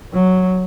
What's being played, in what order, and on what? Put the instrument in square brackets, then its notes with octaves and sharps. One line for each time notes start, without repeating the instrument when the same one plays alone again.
[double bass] F#3